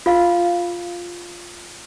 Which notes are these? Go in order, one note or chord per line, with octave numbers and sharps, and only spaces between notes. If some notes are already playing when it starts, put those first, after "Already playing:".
F4 F5